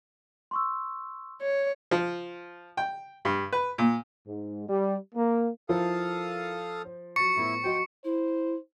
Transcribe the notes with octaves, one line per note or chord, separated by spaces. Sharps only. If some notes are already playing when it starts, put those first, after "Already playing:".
C6 C#6 E6
C#5
F3
G5
G2
B4
A#2
G#2
G3
A#3
F3 E4 A4 A#4 F5 A5 D#6
C5
F#3 C#6 A6 C#7
A2 B3 E4
F#3 F#4 C5 D#5 G5
E4 C5